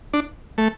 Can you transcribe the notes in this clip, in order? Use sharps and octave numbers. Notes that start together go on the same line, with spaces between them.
D4
A3